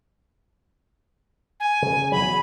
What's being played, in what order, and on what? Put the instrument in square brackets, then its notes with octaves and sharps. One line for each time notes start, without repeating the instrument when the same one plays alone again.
[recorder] G#5
[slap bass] C#3
[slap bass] E2 C#3 F#3 [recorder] B5